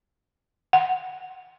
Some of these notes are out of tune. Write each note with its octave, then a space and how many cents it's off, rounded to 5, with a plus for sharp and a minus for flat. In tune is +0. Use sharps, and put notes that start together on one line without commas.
F#5 +15